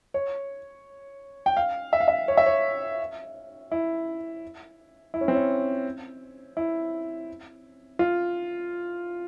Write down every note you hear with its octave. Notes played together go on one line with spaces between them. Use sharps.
C#5
G5
F5
E5
F5
E5
C#5
E5
C#5
E4
E4
C#4
C4
C#4
E4
F4